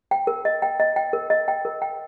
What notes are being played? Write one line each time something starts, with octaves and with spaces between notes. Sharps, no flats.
G5
A#4
D#5
G5
D#5
G5
A#4
D#5
G5
A#4
G5